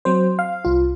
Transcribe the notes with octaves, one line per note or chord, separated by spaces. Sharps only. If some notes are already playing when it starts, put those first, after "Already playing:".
F#3 C4 C5
F5
C2 F4